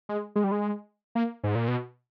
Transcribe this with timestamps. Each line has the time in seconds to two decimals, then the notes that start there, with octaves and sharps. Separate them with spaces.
0.09 G#3
0.36 G#3
0.44 G3
0.52 G#3
1.15 A#3
1.44 G#2
1.55 A#2
1.68 B2